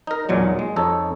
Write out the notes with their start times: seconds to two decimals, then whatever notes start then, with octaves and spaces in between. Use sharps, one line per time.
0.07 D#4 A#4
0.29 B1 E2 A#2 F#3 G#3
0.59 G#3
0.76 F2 D#4 A4 C#5